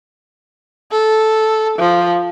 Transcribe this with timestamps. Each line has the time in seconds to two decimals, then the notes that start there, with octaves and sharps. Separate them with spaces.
0.91 A4
1.78 F3